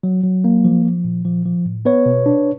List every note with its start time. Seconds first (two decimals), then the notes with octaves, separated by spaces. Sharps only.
0.03 F#3
0.24 F#3
0.44 A#3
0.64 F3
0.85 F3
1.04 A#2
1.25 F3
1.46 F3
1.65 A2
1.85 B3 B4 C#5
2.06 B2
2.26 D4